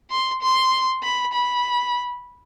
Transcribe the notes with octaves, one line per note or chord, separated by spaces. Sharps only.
C6
C6
B5
B5